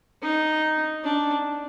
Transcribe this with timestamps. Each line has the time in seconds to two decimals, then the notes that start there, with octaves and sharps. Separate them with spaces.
0.23 D#4
1.04 D4